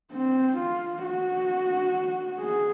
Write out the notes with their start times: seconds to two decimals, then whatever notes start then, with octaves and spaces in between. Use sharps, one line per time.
0.13 C4
0.58 F4
1.04 F#4
2.40 G#4